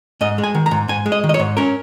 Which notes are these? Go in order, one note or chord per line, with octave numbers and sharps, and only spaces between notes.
G#2 D#5
G#3
G#5
D#3
A#5
G#2
G#2 G#5
G#3
D#5
D#3
D#5
C#5
G#2
C#4 A#4